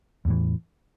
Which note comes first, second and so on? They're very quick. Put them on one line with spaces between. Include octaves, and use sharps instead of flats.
E2 A2 E3